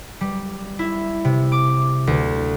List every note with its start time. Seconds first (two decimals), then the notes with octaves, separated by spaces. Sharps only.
0.21 G3
0.79 E4
1.25 C3
1.52 D6
2.07 D2